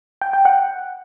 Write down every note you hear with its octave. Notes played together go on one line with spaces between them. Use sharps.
G5
G5
F#5